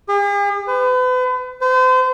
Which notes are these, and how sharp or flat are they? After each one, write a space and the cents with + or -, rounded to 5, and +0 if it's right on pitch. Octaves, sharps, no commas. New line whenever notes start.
G#4 -45
B4 +40
C5 -35